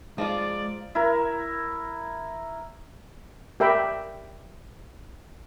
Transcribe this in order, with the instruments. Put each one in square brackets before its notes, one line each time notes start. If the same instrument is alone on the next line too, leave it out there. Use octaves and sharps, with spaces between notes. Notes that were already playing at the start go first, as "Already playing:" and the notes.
[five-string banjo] F3 A#3 F4 [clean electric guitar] G#3 [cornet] D5
[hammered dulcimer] E4 A#4
[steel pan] G4 A#4 E5 G5 A#5 B5